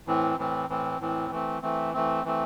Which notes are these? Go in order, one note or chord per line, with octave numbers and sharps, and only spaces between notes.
A2 E3 C4
A2 E3 C4
A2 E3 C4
A2 E3 C4
E3 A3 C4
E3 A3 C4
E3 A3 C4
E3 A3 C4